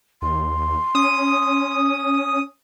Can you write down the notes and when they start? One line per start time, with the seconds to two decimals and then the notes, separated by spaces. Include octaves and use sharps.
0.22 D#2 C6
0.95 C#4 D#6